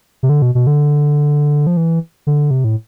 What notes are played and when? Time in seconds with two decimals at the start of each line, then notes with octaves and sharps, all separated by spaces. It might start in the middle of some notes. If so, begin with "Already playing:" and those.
0.23 C3
0.29 D3
0.42 B2
0.55 B2
0.67 D3
1.67 F3
1.77 E3
2.27 D3
2.51 C3
2.64 A2